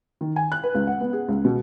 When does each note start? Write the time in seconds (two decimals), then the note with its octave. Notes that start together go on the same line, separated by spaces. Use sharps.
0.21 D#3
0.36 G#5
0.52 F#6
0.63 B4
0.75 C#2
0.87 F#5
1.00 B3
1.13 G#4
1.28 C#2
1.45 B2